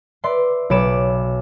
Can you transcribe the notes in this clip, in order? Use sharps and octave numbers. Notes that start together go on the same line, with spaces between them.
B4 D5 E5 C6
B1 C#5 B5 D6 D7 E7